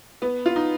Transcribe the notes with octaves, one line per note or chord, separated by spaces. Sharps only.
B3
F4
D#4